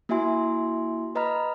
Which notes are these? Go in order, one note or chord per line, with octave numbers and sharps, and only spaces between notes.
A#3 E4 F#4 E5 G#5 C6
B4 D#5 A#5 B5 F6